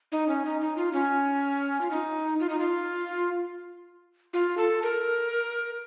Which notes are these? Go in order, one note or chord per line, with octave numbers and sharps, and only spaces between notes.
D#4
C#4
D#4
D#4
F4
C#4
F4
D#4
F4
D#4
F4
F4
A4
A#4